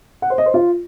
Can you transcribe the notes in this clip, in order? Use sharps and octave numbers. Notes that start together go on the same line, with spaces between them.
F#5
C5
D#5
C5
F4